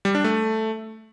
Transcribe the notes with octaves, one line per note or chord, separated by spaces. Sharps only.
G3
D4
A3